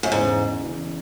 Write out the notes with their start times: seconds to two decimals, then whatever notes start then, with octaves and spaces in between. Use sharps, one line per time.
0.03 F#2
0.11 E1 E2 G#2 C#3 E3
0.61 E1 E2 C#3 E3